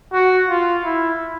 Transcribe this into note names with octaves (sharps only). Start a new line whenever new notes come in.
F#4
F4
E4